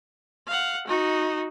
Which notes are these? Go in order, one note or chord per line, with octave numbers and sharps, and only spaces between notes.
F5 F#5
D#4 F#4